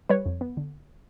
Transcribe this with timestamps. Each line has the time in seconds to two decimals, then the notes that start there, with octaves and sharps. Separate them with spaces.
0.09 G3 B4 C#5
0.26 F2
0.41 B3
0.57 D3